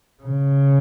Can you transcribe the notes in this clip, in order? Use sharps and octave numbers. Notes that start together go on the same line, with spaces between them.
C#3